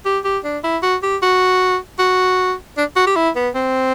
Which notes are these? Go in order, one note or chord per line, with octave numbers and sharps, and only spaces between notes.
G4
G4
D4
E4
F#4
G4
F#4
F#4
D4
F#4
G4
E4
B3
C4